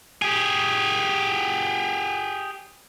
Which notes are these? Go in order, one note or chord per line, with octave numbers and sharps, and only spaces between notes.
G4 G#4